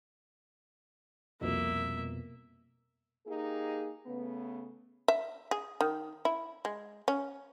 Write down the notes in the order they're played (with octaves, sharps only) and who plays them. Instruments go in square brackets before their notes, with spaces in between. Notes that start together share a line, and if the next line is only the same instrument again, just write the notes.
[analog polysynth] C2 F2 B2 [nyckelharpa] A#3 E5
[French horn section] A#3 D#4 G4 G#4
C#3 A3 B3
[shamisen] E5
G#4
D#3
E4
G#3
C#4